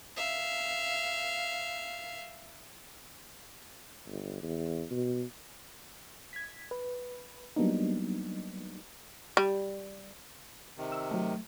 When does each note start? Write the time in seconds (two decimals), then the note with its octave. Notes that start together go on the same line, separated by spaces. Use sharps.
0.17 E5 F5
4.06 G1
4.43 E2
4.91 B2
6.33 G#6 B6
6.71 B4
7.56 F#3 G3 A#3 B3 D4 D#4
9.37 G3
10.77 C3 D#3
10.92 E6
11.11 F#3 A3